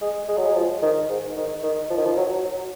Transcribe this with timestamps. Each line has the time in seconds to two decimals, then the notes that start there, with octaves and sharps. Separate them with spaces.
0.01 G#3
0.28 G#3
0.38 F#3
0.46 G#3
0.55 F3
0.82 D#3
1.10 G#2
1.36 D#3
1.63 D#3
1.90 F3
1.98 D#3
2.05 F3
2.17 F#3
2.44 F#3